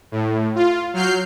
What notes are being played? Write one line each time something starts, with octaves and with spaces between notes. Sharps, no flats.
A2
F4
F#3 F6 G6 C7